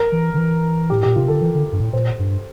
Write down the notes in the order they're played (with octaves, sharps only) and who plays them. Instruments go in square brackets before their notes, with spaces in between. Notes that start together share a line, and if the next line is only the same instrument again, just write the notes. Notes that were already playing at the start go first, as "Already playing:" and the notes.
Already playing: [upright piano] A#4
[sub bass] E3
D3
E3
[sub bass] A2 [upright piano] G4
[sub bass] A#2 [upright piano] G4
[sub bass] C3 [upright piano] F4
[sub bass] D3 [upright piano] A4
[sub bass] E3
D3
G2
A2
[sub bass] A#2 [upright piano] C5
[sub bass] G2